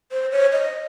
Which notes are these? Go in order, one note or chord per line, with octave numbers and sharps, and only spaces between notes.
C5
C#5
D#5